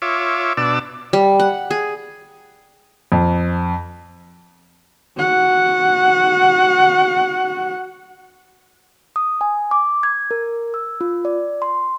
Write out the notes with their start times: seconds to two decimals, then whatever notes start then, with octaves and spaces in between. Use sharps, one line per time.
0.02 F4 C#5 E5 D6
0.57 B2 D4 D5 A5 E6
1.13 G3
1.40 F#5
1.71 G#4
3.12 F2
5.18 F#4 F#5
9.16 D#6
9.41 G#5
9.71 D6
10.03 G#6
10.31 A#4
10.74 E6
11.01 F4
11.25 D5
11.62 C6